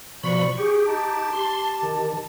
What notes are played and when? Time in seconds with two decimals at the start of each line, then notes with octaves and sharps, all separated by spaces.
0.23 B2 F3 D5 B5 C#6
0.58 G4 G#4
0.86 D#4 A5
1.33 G4 C6
1.83 D#3